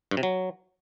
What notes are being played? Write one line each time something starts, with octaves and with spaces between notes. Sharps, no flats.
G2
C3
F#3